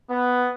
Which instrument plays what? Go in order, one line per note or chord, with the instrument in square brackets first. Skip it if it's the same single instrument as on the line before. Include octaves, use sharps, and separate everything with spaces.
[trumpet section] B3